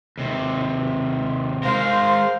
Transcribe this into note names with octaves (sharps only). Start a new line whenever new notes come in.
D#2 C3
G#3 A#4 C5 F5